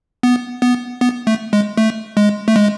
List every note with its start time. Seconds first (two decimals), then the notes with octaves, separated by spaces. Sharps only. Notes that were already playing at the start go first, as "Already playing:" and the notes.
0.23 B3
0.62 B3
1.01 B3
1.27 A3
1.53 G#3
1.77 A3
2.17 G#3
2.48 A3
2.56 G#3